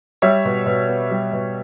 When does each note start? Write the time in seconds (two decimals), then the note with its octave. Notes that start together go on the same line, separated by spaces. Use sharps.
0.22 G3 C#5 E5
0.45 B2
0.66 B2
0.89 B3
1.11 G3
1.33 B2